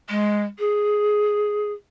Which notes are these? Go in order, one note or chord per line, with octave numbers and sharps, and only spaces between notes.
G#3
G#4